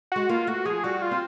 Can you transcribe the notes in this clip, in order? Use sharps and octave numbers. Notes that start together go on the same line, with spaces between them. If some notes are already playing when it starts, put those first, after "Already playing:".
G#3 F#4
A#3 F4
A3 F#4
F3 G#4
G3 F#4
F4
C4